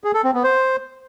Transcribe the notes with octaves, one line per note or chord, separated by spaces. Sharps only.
G#4
A4
C4
B3
C5